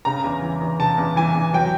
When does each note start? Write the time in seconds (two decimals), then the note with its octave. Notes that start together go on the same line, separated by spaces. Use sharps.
0.05 C#3 A#5
0.24 E2
0.42 E3
0.60 E2
0.79 C#3 A5
0.98 E2
1.16 E3 G#5
1.35 E2
1.53 F#3 G5